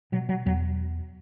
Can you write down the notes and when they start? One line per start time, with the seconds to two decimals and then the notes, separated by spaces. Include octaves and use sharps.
0.12 B2 F#3
0.29 F#3
0.46 E2 F#3